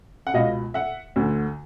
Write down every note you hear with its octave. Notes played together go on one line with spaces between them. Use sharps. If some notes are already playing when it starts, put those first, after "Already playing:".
F#5
C#2 B2 D#5 F5
E5 F#5
D2 D3